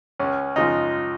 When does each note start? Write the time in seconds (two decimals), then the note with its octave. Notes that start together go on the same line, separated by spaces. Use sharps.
0.20 C#2 C#4
0.56 C#3 F3 G#3 D#4